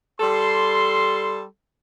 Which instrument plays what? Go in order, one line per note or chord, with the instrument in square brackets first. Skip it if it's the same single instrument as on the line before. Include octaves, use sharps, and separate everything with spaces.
[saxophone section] G3 A4 [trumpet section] C6